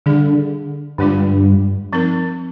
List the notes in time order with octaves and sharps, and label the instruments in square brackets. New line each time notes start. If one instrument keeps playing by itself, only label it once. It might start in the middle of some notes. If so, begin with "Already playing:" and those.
[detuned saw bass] D3 [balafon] G3 D4 G#4
[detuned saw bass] G2 [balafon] D3 G#3 D4 F4
[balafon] F3 C4 D#4 A#4